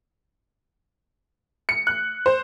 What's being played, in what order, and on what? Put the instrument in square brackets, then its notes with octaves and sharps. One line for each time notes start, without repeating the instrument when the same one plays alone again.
[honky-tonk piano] C#7
F#6
C5